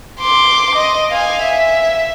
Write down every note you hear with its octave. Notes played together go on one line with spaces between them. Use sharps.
C6 D6
D#5
F5 G#5
E5